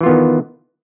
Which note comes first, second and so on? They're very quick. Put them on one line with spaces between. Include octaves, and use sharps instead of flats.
E3 F4 B3 D#3